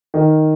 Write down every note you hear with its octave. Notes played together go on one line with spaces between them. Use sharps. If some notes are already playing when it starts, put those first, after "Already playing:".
D#3